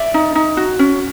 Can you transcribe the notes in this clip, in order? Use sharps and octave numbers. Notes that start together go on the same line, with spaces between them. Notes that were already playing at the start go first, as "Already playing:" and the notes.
Already playing: D5 E5
D#4
D#4
F#4
C#4